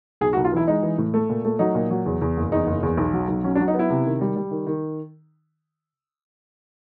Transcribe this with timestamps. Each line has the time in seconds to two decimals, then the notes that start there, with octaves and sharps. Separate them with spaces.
0.21 B1 G#4
0.33 F#4
0.37 B1
0.44 F4
0.52 E3 E4
0.67 G#3 D#4
0.83 E3
0.98 A2
1.14 A3
1.29 A#2
1.45 A3
1.59 F#3 D#4
1.75 A#2
1.91 F#3
2.06 E2
2.21 E2
2.37 F#1
2.52 E2 D#4
2.67 F#1
2.83 E2
2.97 B1
3.13 F#3
3.28 B1
3.44 F#3 C#4
3.55 D4
3.60 F#3
3.68 D#4
3.74 B3
3.79 E4
3.90 C3
4.06 D#3
4.21 G3
4.36 G3
4.51 D#3
4.67 D#3